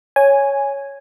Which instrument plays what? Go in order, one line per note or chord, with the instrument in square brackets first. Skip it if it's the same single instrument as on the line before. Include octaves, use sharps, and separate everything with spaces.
[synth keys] C#5 [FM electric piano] G#5